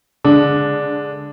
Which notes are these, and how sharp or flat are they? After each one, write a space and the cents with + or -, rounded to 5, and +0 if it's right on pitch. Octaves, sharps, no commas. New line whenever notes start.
D3 -20 G#3 +0 D4 +0